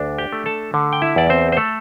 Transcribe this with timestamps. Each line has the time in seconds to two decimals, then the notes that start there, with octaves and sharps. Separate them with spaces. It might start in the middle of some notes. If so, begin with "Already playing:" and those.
Already playing: D2 D4
0.18 G4 G5
0.33 A3
0.46 A4 A5
0.74 D3
0.93 G5
1.02 E4 E5
1.16 E2 D5
1.30 C4 C5
1.52 C5
1.57 A3 A4